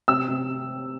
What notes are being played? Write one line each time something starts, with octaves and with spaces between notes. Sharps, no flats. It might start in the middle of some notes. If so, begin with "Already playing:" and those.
C3 E6
C3